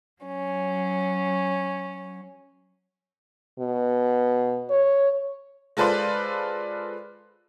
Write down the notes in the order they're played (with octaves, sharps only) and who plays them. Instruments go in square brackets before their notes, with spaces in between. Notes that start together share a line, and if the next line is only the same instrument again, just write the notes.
[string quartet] F#3 C#4
[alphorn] B2
C#5
[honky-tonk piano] G#3 F4 A4 B4 C5 D5